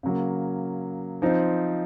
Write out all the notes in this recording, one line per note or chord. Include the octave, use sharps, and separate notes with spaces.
C#3 F#3 A#3
F3 C4 D#4